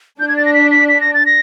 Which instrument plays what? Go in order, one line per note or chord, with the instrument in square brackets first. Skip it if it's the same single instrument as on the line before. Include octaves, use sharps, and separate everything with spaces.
[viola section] D4 [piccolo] G6
[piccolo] G#6
A6
A#6
B6
B6
B6
A#6
A6
A#6